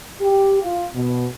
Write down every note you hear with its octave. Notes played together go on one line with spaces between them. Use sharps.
G4
F4
B2